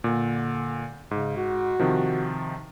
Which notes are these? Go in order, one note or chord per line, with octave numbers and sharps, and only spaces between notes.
A#2 D3
G#2 C#3
F#4
C3 D#3 F3